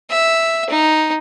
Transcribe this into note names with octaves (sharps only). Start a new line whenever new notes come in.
E5
D#4